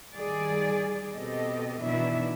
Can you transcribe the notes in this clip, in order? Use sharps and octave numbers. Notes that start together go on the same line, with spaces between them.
D#3 G3 G#4 D5
B2 C4 G4 A4 D#5
B2 D#3 E3 D4 E4 E5